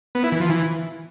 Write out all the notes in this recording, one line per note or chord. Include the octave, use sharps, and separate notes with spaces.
B3
E4
E3
F3
E3